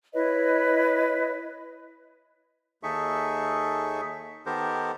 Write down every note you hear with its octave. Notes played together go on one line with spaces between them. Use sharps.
E4 B4 C#5 D#5
D#2 D#4 G#4 A4 E5 C#6
D#3 B3 G4 A4 A#4 C5